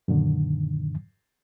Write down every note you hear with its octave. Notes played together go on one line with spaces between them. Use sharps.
F#2 A#2 D3 D#3